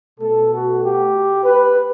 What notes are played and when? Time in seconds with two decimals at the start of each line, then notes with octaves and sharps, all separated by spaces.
0.20 B2 A3 A4
0.52 F#4
0.82 G4
1.45 B4